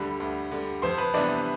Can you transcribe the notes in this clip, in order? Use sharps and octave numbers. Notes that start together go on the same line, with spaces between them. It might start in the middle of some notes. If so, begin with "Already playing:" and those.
Already playing: D2 D3 G3 B5
D2
D3 G3
F2 C5 C6
B4 B5
C3 E3 G3 B3 D4 D5